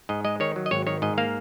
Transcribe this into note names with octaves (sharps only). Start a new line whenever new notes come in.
G#2 D#5
G#3 D#5
D#3 C#5
F#3
D#5
G#1 C#5
D#3 C#5
G#2 D#5
A#3 F5